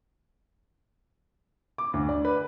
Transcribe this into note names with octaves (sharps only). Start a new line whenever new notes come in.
D6
D2
D5
B4